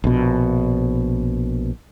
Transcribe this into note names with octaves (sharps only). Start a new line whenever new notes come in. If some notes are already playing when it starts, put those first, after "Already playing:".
A#1 B2